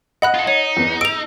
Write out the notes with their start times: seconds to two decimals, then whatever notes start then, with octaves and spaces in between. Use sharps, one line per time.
0.22 D#5 F#5 B5 F#6
0.34 F4 A4
0.47 D#4 C#5
0.77 E2 B3
1.01 E6 D7 F7